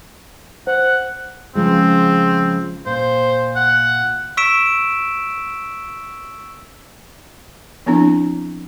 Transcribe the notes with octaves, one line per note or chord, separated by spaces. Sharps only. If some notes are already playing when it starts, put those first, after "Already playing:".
C5 F#5
C#3 F3 G#3 C4
A#2 C5
F#5
C#6 E6 B6 D7 E7
F3 B3 C4 D4 E4